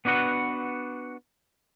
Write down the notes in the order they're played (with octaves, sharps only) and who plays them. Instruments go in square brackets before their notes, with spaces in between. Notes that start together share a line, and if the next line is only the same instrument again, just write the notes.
[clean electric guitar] B3 D4 F#4 B4 F#5